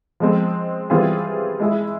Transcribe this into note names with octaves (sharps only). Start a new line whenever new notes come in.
F3 G#3 C4
E3 G3 C4 F4 G#4
G#3 E4 G#4